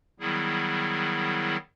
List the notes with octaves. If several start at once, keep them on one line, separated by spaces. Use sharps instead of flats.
D#3 F#3 G3 B3 E4 G#4